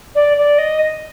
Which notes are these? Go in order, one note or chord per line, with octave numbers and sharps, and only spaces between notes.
D5
D5
D#5